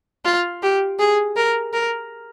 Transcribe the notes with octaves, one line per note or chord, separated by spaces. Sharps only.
F4
G4
G#4
A#4
A#4